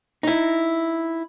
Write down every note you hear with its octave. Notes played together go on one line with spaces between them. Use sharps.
D#4 E4